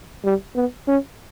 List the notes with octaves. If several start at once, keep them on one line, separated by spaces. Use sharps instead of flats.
G3
B3
C#4